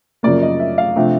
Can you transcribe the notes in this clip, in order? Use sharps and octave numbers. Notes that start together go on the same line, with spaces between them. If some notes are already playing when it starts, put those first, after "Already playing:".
F#2 C#3 F3 A#3 D5
D#5
E5
F5
C3 F3 A3 D4